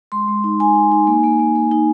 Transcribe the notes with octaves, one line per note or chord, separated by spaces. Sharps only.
G#3 C6
G#3
D#4
D#4 G#5
D#4
D#4
A#3
A#3
A#3
A#3
D#4